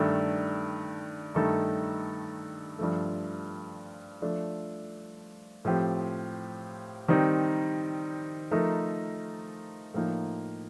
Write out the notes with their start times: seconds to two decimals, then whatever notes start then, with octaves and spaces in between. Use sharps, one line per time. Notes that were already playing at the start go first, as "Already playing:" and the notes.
Already playing: G2 D#3 A3 D4
1.35 G2 D#3 A3 D#4 A4
2.79 G2 F3 A3
4.22 F3 A3 D4
5.65 A2 F3 C4 G4
7.08 D#3 G3 C4 D#4
8.51 F3 A3 D#4 A#4
9.94 A2 F3 A#3 D#4